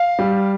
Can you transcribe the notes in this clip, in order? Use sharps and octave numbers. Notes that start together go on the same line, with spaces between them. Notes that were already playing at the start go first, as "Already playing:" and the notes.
Already playing: F5
G3